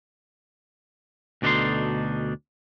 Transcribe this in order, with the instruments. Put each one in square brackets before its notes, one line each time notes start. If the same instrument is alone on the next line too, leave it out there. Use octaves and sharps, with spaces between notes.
[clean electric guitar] D2 B2 D4 D#4 A4 C6